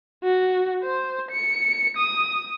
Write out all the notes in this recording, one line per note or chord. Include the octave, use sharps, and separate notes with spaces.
F#4
C5
C#7
D#6